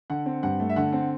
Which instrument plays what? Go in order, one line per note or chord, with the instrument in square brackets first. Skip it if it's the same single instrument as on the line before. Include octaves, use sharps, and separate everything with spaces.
[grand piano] D3 F#5
C4
G2 F#5
A3
E5
D3 F#5
C4 F#5